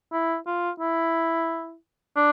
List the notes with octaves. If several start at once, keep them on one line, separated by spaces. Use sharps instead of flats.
E4
F4
E4
D4